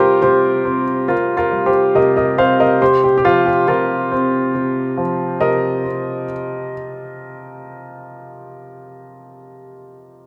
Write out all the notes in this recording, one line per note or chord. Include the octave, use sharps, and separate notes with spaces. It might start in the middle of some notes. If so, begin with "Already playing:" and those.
Already playing: C3 G3 F4 G4 A#4 C5
C3 G4 C5
C4
C3 F4 A#4
F4 A#4
G3
G4 C5
C3 A#4 D#5
A#4 D#5
C4 C5 F5
A#4 D#5
C3 G4 C5
G4
G4
F3 F4
G4
C3 F4 A#4
C4
C3
F3
C3 A#4 D#5
C4